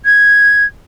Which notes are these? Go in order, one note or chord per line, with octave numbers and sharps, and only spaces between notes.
G#6